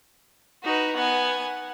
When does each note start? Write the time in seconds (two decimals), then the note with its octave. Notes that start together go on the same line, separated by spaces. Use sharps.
0.64 D#4 F#4 B4
0.96 B3 F#5 G#5